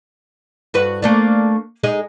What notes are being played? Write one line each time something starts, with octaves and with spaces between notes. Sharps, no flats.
G2 F#4 B4
A3 A#3 D4
G#3 D#4 G#4